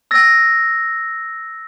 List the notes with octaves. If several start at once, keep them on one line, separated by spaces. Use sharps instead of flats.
E6 A6 A#6